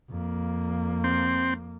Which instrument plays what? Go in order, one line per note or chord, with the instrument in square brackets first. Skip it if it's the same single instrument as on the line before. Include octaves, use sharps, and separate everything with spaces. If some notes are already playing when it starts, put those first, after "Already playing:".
[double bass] F2 A#3
[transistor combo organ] C4